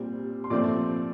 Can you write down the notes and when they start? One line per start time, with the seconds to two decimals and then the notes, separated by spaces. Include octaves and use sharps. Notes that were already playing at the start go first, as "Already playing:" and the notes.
Already playing: A#2 G3 C4
0.44 C6
0.50 A#2 F3 A3 C4 D5 D6